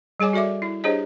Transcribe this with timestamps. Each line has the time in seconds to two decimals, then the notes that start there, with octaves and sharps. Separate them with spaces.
0.20 G3 G#4 C#5 G#5 D6
0.33 F#4 A4 D5 E5 D6
0.62 E4
0.84 D4 G4 G#4 C5 C#5 D#5